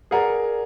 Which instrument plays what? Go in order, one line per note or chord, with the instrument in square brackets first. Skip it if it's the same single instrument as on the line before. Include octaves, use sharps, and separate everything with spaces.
[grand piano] G#4 A#4 [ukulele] B4 D5 F#5 A#5